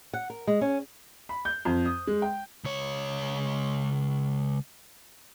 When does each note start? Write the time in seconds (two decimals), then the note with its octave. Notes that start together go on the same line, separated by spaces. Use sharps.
0.14 F#5
0.30 A#4
0.47 G#3
0.61 C#4
1.29 B5
1.45 G6
1.65 F2
1.85 D#6
2.07 G#3
2.22 G5
2.64 C#2 C#5